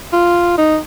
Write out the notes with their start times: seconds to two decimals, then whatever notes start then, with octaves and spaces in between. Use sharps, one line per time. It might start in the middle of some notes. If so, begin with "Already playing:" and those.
0.13 F4
0.58 D#4